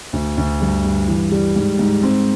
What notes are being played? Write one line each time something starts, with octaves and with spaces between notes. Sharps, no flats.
D2
D2
G2
G2
E3
G3
G#2
G#2
C4